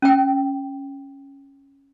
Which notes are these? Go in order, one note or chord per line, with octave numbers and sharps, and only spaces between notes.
C#4 G5